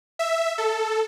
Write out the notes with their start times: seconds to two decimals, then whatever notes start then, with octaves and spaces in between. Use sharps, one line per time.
0.19 E5
0.58 A4